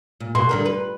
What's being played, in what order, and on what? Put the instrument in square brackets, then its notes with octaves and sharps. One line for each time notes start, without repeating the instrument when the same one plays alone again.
[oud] A#2
[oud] B2 F#4 [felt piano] C6
[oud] G2 D3 A#4
B4